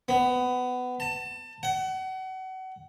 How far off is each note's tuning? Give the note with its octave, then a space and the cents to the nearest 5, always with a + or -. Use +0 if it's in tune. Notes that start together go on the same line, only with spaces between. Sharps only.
B3 +20
A5 +25
F#5 +30